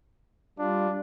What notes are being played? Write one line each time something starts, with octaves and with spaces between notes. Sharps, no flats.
G3 D4 F4